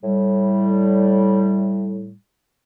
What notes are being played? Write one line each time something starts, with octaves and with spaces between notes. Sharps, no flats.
A2 G3